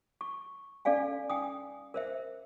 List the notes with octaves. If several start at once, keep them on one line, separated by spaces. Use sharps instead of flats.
C#6
C#4 A4 D5 F5 G#5
G5 G#5 D#6
A#4 C5 E5